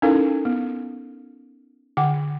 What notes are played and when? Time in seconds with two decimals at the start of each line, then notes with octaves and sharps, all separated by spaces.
0.02 C#4 D#4 E4 A4 A#4 F5
0.45 B3
1.97 D3 F#5 D6